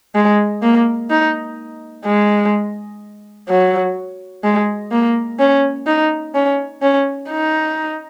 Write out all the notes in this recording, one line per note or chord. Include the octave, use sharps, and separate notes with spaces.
G#3
A#3
D#4
G#3
F#3
G#3
A#3
C#4
D#4
C#4
C#4
D#4